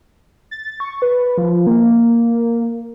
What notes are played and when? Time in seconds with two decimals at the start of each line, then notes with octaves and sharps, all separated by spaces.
0.51 A6
0.80 C#6
1.02 B4
1.38 F3
1.67 A#3